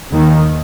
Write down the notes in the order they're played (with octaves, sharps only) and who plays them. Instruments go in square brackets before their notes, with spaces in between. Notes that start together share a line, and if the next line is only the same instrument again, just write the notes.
[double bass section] D#2 D#3